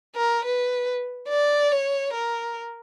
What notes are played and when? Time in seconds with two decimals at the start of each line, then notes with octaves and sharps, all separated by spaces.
0.16 A#4
0.45 B4
1.29 D5
1.71 C#5
2.14 A#4